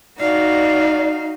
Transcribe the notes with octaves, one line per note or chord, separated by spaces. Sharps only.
D#4 F#4 D5 F5